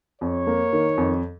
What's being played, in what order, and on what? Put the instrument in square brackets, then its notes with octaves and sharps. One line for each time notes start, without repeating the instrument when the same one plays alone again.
[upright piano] F2 [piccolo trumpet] C#5
[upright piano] A#3
D#3
F2